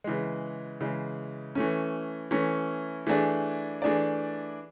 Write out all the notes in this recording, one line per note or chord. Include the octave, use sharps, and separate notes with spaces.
C#3 E3 G#3
C#3 E3 G#3
E3 A3 C#4
E3 A3 C#4
E3 A3 D4 G#4 D5
E3 A3 D4 G#4 D5